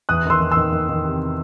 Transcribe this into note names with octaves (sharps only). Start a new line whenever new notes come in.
E2 D#6 F#6
D#3 C6 E6
D#3
C6 E6
D#3
D#3
D#3
C3